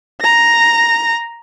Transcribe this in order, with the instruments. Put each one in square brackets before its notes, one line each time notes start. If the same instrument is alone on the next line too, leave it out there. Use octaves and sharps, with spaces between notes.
[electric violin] A#5 A#6